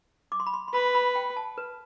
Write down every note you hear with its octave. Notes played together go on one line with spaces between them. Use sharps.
D6
C6
B5
C6
C6
B4 B5
B5
G5
A5
B4